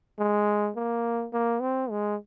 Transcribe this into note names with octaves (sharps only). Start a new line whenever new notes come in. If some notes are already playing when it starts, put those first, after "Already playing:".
G#3
A#3
A#3
C4
G#3